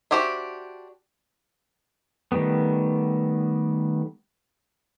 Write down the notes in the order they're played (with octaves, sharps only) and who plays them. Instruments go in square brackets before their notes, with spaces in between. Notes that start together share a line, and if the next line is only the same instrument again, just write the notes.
[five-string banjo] D4 F#4 G4 C5 E5
[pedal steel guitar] D#3 G3 A3 B3